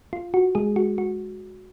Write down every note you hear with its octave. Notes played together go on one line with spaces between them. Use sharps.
F4
F#4
G#3 G#4
F#4
F#4